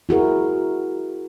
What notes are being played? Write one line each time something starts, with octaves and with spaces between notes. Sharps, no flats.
E4 F#4 G#4 A#4